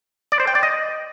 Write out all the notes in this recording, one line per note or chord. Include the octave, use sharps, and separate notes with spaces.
D5
C5
G5
D5
D#5